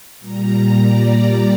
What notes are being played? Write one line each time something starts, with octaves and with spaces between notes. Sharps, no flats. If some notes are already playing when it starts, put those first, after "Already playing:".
A#2 G3 A#5
D5